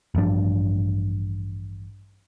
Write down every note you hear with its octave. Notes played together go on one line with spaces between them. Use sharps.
A1 G2 F3 D4